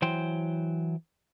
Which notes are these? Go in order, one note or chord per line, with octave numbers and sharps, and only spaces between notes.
E3 F#3 C5 G5